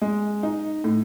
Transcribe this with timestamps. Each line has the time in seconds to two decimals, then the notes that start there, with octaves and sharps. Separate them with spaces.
0.02 G#3
0.43 D#4
0.84 A2